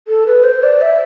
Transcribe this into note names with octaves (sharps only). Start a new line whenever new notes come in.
A4
B4
C5
D5
E5